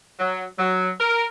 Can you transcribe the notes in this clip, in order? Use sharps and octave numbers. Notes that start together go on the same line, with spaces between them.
F#3
F#3
A#4